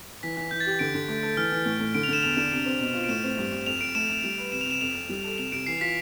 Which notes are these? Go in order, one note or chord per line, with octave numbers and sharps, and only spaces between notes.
E3 B6
E3 B6
E3 G6
A6
G4
D3 D7
D3
A3
A4
E3 F6
E3
A2
A2
D3 D7
F7
D3 E7
E2 F7
D4 E7
C3 D7
C4
B2
F4
D7
A2 E7
C4
G2
G2
F2 F7
F2 D7
A3 E7
A3
G3
B4
C3 E7
F7
C3 E7
F2 F7
F2
G3
A4
C3 F7
C3 D7
E3 C7
F4 B6